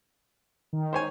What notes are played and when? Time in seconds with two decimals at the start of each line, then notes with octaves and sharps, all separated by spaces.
0.73 D#3
0.93 C5 C#5 G#5